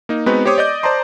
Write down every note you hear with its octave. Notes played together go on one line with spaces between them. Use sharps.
A#3 D#4
G#3 B3 C4 D#4 F#4 B4
G4 C5 C#5 D6 D#6
D5 D#5 G6
C5 D5 A5 A#5 C6